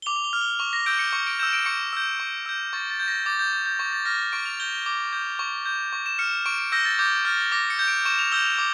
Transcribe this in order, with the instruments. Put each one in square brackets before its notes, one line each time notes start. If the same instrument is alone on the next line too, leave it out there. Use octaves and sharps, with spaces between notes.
[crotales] G7
D6 F7
F7
G7
F6
G7
C#6 F7
A#6
E6 G6 D7
C#7
C#6 C#7
D7
E6 G6 E7
D7
C#6 C#7
E6 G6
C#6
E6 G6
C#6 A6
A6
G6
A#6
D6 A6
G6
G6
G6
C#6 G6
A6
F6 A#6
C#6 D7
F7
G6 G7
G7
D6
G6
C#6
G6
C#6
E7
F6 C#7
C#6 D7
D7
E6 G6 A#6
A6
D6 G6
F6 A6
D6 A#6
C#7
G6
D7
C#6 E7
F7
E6 G6 G7
F7
D6